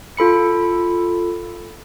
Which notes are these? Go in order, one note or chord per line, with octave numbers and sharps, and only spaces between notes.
F4 A4 B5 C#7